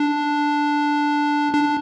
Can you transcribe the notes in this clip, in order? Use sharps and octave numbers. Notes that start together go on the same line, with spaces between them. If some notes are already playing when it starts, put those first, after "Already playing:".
Already playing: D4
D4